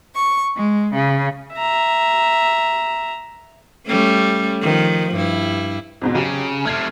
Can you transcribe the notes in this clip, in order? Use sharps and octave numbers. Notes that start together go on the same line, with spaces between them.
C#6
G#3
C#3
E5 A#5
G3 A3 C#4
D#3 F3
G2 E4
F2 G#2 B2
C#3 F#3 G4
C3 A3 F6 G#6 C7